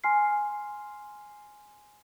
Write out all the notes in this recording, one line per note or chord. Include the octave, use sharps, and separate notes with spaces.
G#5 C6 F6 C7